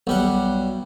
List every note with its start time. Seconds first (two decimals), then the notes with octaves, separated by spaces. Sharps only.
0.07 B1 G3 F#5